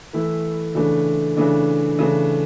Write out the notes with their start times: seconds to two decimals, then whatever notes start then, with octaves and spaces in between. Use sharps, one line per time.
0.13 E3 A3 E4
0.75 C#3 E3 A3 D4
1.36 C#3 E3 A3 D4
1.99 C#3 E3 A3 D4